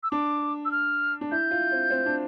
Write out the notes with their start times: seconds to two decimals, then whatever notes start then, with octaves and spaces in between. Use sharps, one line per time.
0.03 E6
0.11 D4 D6
0.65 E6
0.71 F6
1.21 D4
1.31 E4 G6
1.51 F4
1.72 C4
1.91 C4
2.06 D4